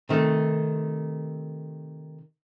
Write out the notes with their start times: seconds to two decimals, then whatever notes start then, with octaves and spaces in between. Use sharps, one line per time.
0.09 C3 D#3 A3